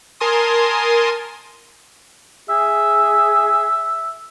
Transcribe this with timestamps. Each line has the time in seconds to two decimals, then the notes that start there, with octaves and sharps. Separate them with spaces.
0.20 A#4 G#5 A5 C6 D#6
2.50 G#4 E5